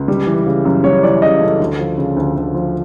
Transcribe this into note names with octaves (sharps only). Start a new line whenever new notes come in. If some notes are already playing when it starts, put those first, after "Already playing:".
Already playing: C#2
G3
E3
C#3
F#2
G3 C#5
E3 D5
C#3 D#5
F#2 A4
D2
F3
C#3
D2
D2
F3